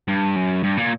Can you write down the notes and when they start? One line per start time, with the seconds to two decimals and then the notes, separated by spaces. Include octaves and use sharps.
0.08 G2
0.36 F#2
0.63 G2
0.77 A#2